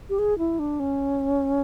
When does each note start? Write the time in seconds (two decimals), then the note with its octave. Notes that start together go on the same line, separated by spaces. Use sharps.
0.09 G4
0.19 G#4
0.39 E4
0.59 D4
0.80 C#4